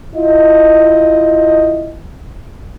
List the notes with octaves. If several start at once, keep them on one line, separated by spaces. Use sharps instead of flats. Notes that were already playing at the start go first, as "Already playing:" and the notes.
E4 F4 D#5